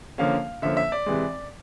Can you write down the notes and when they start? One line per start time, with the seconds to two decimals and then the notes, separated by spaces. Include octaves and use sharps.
0.18 D3 F3 A#3 C#4 F5
0.62 D3 F3 A#3 C#4 E5
0.77 E5
0.92 D5
1.06 C3 E3 G#3